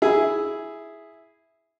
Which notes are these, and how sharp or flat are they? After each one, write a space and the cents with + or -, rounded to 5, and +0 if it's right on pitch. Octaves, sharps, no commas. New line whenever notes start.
E4 +0 G#4 +0